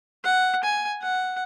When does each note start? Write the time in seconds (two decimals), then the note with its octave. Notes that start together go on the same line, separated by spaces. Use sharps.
0.24 F#5
0.64 G#5
1.02 F#5